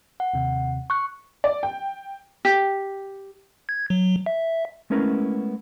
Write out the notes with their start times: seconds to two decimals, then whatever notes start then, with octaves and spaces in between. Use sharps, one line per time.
0.20 F#5
0.33 D#2 C3
0.90 C#6 F#6
1.44 D5
1.63 G5
2.45 G4
3.69 G#6
3.90 F#3
4.26 E5
4.90 G#3 A3 B3 C#4 E4 A#4